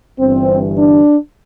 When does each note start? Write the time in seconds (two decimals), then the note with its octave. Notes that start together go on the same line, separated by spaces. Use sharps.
0.19 G1 G2 E3 C4
0.76 D4